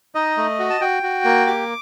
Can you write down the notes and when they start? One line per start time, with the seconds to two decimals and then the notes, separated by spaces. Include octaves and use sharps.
0.15 D#4 D#5
0.37 A3
0.59 F#4
0.70 A5
0.81 F#4 G5
1.03 F#4
1.25 A#3
1.47 G4 D6